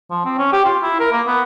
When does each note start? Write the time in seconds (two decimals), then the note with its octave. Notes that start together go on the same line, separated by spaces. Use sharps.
0.10 F3
0.25 C4
0.38 C#4
0.53 G4
0.65 F4
0.83 E4
1.00 A#4
1.12 A#3
1.27 B3